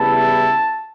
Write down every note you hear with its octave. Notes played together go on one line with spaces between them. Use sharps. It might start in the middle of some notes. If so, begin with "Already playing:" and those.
Already playing: E2 C#3 G3 B3 E4 A5